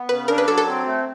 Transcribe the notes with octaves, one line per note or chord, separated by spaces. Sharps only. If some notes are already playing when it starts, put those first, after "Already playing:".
Already playing: B3
C#3 B4
D4 A#4
B4
F#3 A4
A4
C4
A3